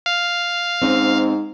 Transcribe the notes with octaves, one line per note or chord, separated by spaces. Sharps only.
F5
G#2 C4 C#4 D#4